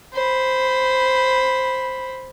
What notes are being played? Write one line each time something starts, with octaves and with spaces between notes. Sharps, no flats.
C5 B5